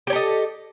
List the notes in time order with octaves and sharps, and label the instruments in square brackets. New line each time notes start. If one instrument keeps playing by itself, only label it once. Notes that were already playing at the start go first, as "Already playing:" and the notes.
[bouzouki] G4
C#5
A4
D#5